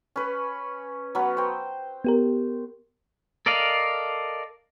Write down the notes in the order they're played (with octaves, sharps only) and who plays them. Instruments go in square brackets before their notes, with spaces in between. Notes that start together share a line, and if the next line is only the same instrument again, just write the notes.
[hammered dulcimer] C#4 B4
F#3 B3 C#4
C5 G5
[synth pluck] B3 G4 A#4
[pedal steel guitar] A4 A#4 D5 D#5 F5